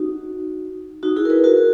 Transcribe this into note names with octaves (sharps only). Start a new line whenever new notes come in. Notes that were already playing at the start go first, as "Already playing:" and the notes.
Already playing: D#4 F#4
D#4 F#4
E4 G#4
A#4
G#4 B4
F#4 A#4